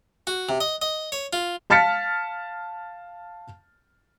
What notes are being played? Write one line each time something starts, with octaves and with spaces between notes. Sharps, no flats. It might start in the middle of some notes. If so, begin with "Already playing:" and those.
F#4
C3
D#5
D#5
C#5
F4
F5 A5 F6 A6 B6 C#7